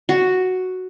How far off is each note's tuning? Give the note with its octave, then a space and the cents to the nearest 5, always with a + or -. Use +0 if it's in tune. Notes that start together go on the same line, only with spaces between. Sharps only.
F#4 +0